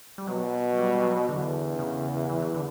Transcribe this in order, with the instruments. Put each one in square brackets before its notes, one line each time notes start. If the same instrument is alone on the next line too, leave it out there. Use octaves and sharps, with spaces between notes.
[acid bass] G3
[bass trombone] B2 [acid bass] F#3
[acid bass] G3
G3
F#3
[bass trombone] E2 [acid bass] D3
[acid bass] C#3
E3
E3
D3